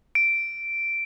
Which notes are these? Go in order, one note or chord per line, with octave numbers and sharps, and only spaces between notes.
D7